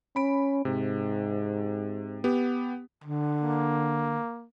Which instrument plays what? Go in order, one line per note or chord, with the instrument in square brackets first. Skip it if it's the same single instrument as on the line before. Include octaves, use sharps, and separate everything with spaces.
[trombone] C#4 [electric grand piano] B5 D7
[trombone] G#2 [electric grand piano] C3
[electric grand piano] B3 G4
[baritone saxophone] D3
[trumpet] A#3